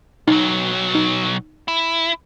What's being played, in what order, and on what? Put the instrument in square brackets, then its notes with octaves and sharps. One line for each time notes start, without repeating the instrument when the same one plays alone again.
[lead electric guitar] B1 F#3 [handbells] D#4
[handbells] D#4
[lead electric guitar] E4